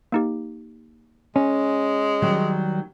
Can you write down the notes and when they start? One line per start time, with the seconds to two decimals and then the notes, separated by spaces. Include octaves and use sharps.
0.12 A#3 D#4 G4
1.36 G#3 C#4
2.22 D#3 F#3 G3